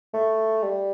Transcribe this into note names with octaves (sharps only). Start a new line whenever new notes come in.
A3
G3